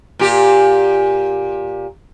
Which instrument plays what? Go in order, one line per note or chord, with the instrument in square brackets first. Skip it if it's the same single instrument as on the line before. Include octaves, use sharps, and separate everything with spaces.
[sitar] A#2 G4